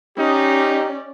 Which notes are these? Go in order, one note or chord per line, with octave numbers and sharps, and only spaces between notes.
C#4 D#4 G4 D5